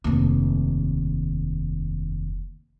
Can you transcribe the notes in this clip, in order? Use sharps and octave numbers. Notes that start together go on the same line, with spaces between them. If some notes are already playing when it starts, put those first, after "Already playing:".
F1 D#2